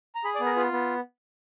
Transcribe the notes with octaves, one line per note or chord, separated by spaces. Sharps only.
A#5
G#4 B5
D5
B3
A#4
F4 B4
B3